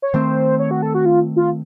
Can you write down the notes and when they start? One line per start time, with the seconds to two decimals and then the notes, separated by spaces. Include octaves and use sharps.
0.02 C#5
0.14 D#3 A3 C4 C5
0.59 C#5
0.71 F#4
0.82 A4
0.95 F#4
1.06 F4
1.36 F4